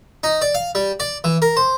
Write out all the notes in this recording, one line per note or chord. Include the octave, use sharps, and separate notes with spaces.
D#4
D5
F5
G3
D5
E3
A#4
C5